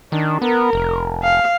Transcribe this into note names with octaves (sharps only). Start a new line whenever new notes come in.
D#3 D4
B3 A#4
F1
F5